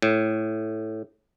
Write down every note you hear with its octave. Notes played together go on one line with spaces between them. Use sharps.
A2